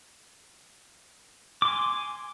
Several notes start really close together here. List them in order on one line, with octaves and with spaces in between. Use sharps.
D6 C6 G#5